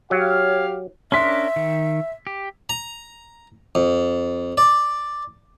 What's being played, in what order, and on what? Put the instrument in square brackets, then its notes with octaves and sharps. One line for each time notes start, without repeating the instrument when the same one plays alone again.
[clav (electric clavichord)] F#3 [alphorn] G4 [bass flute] C#5 [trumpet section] F5
[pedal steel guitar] C#4 D4 A#4 [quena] E5 [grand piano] C6 B6
[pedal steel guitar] D#3
G4
[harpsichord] A#5
F2
D5